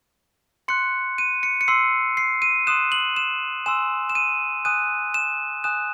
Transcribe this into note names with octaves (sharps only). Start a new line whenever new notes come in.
C6 F#6 C#7
D#7
C#7
C#7
C6 E6 C7
C7
D#7
C6 D#6 F#6 E7
F#7
E7
G#5 C6 E6 E7
E7
D#7
G#5 D#6 F#6 D#7
E7
G#5 D#6 F#6 E7